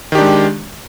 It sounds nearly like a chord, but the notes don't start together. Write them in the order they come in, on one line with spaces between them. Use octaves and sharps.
D#3 G4 D4 G#3